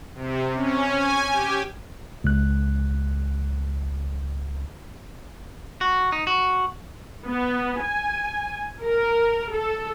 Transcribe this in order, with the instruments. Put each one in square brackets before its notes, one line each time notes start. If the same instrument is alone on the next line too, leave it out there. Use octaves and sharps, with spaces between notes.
[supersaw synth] C3
C#4
G#5
G4
[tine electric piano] C#2 F#6
[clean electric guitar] F#4
D#4
F#4
[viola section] B3
G#5
A#4
A4